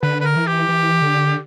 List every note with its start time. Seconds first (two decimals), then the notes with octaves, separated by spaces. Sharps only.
0.02 D3 B4
0.21 B4
0.24 A#4
0.36 E3
0.47 G4
0.69 E3
1.02 D3